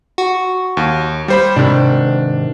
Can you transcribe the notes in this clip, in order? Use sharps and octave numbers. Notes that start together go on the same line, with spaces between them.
F#4
D#2
G3 C5 B5
G#2 C3 D#3 D4